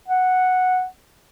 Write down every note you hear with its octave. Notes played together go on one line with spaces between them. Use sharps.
F#5